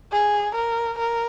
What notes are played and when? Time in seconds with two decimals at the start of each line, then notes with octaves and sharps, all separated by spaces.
0.12 G#4
0.55 A#4
0.99 A#4